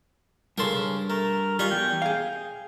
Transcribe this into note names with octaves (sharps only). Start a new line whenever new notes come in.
G2 C#3 A4 A#4 C6
A3 A#4
G3 F4 D#5 G#5 C#6
E2 G5
G#4 F5